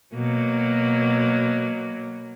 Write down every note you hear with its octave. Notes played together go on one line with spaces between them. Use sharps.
B2 F#3 A#3